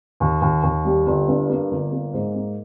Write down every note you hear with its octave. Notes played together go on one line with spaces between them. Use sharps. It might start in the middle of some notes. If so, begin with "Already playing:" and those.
D#2
D#2
D#2
G3
G1
G2
A#3
G1
A#3
G#2
A#3